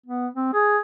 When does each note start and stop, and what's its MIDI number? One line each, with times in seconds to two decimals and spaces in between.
0.06 0.27 59
0.35 0.50 60
0.53 0.78 68